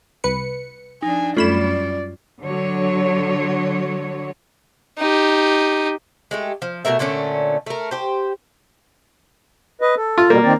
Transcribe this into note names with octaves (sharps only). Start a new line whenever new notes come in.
C2 B4 C#7
F3 D4 D#4 G#5
F#2 G3 A3 C#4 F4 D5 B5 E7
D3 F#3 C#5
D#4 G4
G#3 A3 G4
F3
B2 A3 A#4 E5
A#2 D3 A3 C#4
A3 A#4
G4 C5
B4 D#5
A4
F4
B2 G3 A#3
D#3 C4 D5